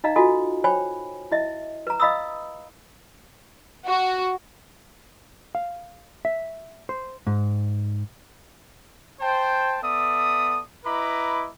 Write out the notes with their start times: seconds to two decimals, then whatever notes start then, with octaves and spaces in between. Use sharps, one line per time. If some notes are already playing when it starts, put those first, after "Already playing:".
0.04 D#4 D#5 F5 A#5
0.16 F4 F#4 A4 D#5 G#5
0.64 C5 C#5 G5 G#5 B5
1.32 E4 D#5 E5
1.87 B4 A#5
2.00 D#5 F5 B5 D#6 E6
3.90 F#4
5.55 F5
6.25 E5
6.89 C5
7.27 G#2
9.20 C5 G5 A5
9.83 B3 A4 D5 E5 D#6
10.85 E4 B4 D#5 A#5 B5 D6